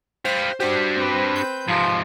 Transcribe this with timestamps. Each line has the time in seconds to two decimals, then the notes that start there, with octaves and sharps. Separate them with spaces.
0.25 G4 C5 F5
0.60 D4 F#4 G4 C5
0.95 C4 B4
1.36 G6
1.68 G#2 C3 F3